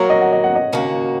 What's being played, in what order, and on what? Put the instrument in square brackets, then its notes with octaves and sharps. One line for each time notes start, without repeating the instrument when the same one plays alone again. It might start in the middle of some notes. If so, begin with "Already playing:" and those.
Already playing: [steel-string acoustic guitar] F#3 A#3 F#4 A#4 [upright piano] C#5
[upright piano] D#5
F#5
D#5
F#5
D#5
[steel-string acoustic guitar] D#2 C#3 A#3 F#4